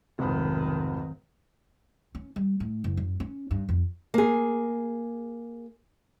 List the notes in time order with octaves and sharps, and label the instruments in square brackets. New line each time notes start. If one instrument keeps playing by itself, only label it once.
[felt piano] F1 G#2 B5 [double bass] B1 D#3
[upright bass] C#4
G3
A2
F#1
F#2
C#4
G2
F2
[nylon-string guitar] A#3 G#4